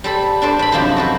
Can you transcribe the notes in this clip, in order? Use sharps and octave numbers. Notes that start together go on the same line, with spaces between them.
G3 A4 C5 B5
D4 A4 C5 D5
G2 B5
F#2 C3 F3 D#4 C5 G5
F#4 A4 B4